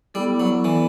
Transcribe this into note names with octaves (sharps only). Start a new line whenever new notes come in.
G3 B3 E4 A4 D5
F#3
E3 B3 E4 A4 D5